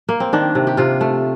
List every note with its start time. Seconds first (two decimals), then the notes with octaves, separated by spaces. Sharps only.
0.09 A#3
0.20 C4
0.33 D#3 D4
0.55 C3
0.67 G4
0.77 C3 F4
1.01 A3